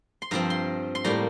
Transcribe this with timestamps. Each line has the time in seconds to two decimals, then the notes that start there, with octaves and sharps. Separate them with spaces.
0.22 C6
0.31 G2 F3 C4 A#5
0.50 C6
0.95 C6
1.04 A2 G3 A#3 A#5